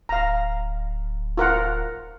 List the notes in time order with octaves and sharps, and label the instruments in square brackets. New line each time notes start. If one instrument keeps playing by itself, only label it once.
[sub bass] D1 [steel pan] F5 A#5
[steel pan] F4 A#4 F#5